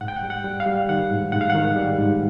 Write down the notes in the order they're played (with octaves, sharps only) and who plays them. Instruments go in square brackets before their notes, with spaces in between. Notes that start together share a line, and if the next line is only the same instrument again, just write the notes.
[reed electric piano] G#2 F#5
G5
F#5
G3
F#5
G3
F5
G3
D#3 F#5
G#2
G#2 F#5
F5
F#5
D#3
G3
G#2